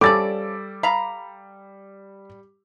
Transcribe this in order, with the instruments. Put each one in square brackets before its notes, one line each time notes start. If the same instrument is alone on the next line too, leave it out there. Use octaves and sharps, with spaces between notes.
[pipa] F3 C#4 D5 [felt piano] G3 E6 [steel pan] A4 [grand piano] D6 A6
[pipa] F5 A#5 [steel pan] B5